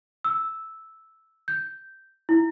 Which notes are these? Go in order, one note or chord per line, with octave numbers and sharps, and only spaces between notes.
E6
G6
E4